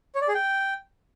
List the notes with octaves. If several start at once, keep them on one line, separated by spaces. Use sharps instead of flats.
C#5
D5
G#4
G5